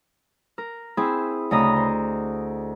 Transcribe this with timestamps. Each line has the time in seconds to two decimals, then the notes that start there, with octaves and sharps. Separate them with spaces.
0.58 A#4
0.97 C4 E4 G#4 B5
1.51 D2 C#3 D#5 A#5 B5 D#6
1.76 C5